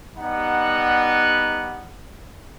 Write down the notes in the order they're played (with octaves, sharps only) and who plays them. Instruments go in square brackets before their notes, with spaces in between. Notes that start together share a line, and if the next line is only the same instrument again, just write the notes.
[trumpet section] G3 B3 D#4 F#5